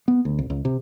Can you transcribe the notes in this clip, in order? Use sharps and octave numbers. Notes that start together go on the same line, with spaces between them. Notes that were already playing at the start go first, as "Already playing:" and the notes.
B3
D2
C2
C#2
C3